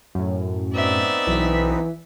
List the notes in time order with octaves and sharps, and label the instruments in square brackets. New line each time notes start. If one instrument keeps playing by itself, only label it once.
[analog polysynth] F#2 A2
[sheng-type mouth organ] B3 C4 D#4 [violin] D5 E5
[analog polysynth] B1 B6 [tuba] E3